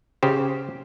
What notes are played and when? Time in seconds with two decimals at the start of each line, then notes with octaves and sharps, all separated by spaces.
0.23 C#3 G4 C5